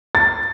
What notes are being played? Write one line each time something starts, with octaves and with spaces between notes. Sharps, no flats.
A6